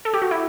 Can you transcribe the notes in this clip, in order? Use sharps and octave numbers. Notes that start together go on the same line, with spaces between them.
A4
G4
F#4
E4